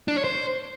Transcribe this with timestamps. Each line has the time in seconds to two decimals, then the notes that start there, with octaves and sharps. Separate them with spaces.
0.08 D4
0.16 C#5
0.24 C5